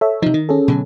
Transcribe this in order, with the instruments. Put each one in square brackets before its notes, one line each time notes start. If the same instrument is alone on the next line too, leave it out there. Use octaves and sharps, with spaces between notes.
[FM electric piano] A4 C#5 E5
[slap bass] C3 F3 [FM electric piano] D#4
[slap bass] D#3
[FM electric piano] C#4 G#4 A4
[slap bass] B2 D3 F#3